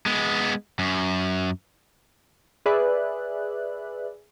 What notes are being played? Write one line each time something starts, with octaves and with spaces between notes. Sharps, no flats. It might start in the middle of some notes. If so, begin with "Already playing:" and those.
G#3 B3
F#2
G#4 B4 D5 E5 F#6